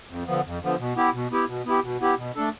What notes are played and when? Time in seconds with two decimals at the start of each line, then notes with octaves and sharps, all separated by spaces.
0.10 F2
0.27 D3 F3 B3
0.45 F2
0.62 D3 F3 B3
0.79 B2
0.96 B3 E4 G4
1.14 B2
1.31 B3 E4 G4
1.48 B2
1.65 B3 E4 G4
1.83 B2
2.00 B3 E4 G4
2.18 B2
2.35 A3 D4 A4